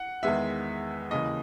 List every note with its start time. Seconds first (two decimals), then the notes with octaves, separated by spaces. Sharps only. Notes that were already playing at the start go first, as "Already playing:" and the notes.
Already playing: F#5
0.23 E2 D#3 G#3 B3 E5
1.11 D#2 C#3 E3 D#5